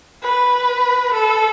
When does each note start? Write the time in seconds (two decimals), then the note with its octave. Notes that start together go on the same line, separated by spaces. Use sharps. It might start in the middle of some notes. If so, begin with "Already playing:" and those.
0.23 B4
1.14 A4